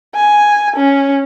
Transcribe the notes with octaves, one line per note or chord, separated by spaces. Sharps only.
G#5
C#4